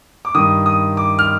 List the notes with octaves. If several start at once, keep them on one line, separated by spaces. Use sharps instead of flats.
D6
G2 D#3 D#6
D#6
D6
F6